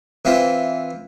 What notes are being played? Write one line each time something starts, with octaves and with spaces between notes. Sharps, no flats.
E3 C4 F4